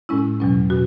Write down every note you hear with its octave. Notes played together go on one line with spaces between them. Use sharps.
A2 G#3 C#4 E4
E2 B2 F#3 C#4
B2 F#4